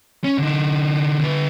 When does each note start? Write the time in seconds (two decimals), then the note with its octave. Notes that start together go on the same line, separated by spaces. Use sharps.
0.24 C#4
0.38 D3 D#4
1.20 D3 B4